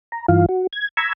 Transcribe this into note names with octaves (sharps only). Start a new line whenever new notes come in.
A#5
G2 E3 F4 F5
F#4
G#6
A#5 B5 C#6 E6 G#6